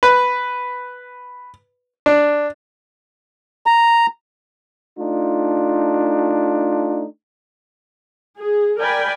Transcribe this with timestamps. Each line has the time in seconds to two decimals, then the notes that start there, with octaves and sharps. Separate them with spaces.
0.03 B4
2.06 D4
3.66 A#5
4.98 A3 D4 D#4 F4
8.40 G#4
8.79 A#4 D5 G5 G#5 B5